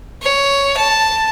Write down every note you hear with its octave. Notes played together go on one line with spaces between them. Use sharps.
C#5
A5